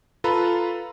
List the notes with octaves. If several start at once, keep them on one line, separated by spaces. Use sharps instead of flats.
F4 A4 B4 A#5 B5